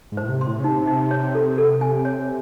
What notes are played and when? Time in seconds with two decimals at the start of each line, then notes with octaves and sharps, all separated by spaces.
0.12 G#2
0.17 A2 C5
0.29 C3
0.41 C6
0.47 A2
0.59 C#3
0.64 C3 D#4
0.87 D#4
1.11 C#5
1.35 A4
1.58 A4
1.81 G#5
2.05 C#5